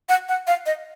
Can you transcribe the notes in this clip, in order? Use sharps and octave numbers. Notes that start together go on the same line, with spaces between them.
F#5
F#5
F5
D#5